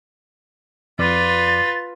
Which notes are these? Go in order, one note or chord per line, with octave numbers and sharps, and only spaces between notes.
F2 F4 B4 D5 D6 A6